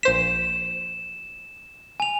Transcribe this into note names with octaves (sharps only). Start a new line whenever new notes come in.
A#1 C5 B6 E7
G#5 F7